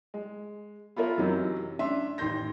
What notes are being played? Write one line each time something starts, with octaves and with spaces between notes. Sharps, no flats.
G#3
B3 F4 A4 A#4 C#5 E5
F#2 C3 E3 F#3 D#4
C#4 D4 D5 E5 C6
A1 D#3 C6 G6 A#6